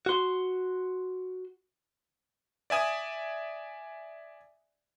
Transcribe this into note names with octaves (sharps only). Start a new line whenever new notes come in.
F#4 C6
D5 E5 G#5 D#6